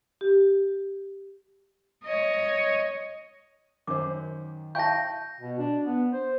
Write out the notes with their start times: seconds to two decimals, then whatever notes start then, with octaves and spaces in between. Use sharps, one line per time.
0.21 G4
2.04 C#5 D#5
3.87 F#2 D#3 C5 D6
4.75 E4 F5 G5 A5 C#6 G6 A#6
5.41 B2
5.59 D4
5.84 B3
6.13 C5